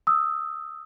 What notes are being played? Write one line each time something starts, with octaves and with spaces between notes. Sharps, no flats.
D#6 E6